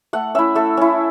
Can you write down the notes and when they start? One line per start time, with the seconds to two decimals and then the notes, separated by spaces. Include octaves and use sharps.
0.13 A3 F#5
0.35 C#4 E4 E5
0.55 A3 A4
0.77 C#4 E4